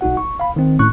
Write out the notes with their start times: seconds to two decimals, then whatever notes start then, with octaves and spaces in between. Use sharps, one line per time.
0.01 B1 D#4 F#4 F#5
0.17 C#6
0.40 F5 B5
0.56 D#3 C4
0.79 A2 C#4 C#6 F#6